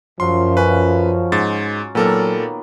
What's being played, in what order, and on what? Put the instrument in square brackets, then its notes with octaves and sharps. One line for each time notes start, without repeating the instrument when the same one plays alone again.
[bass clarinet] F#2 [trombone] F3 [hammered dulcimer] F#3 F4 B5 [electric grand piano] C6
[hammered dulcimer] C#4 [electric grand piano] B4
[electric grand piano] G#2 A6
[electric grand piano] A#2 A4 A#4 [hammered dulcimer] D#3 A#3 B3 [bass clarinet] F#3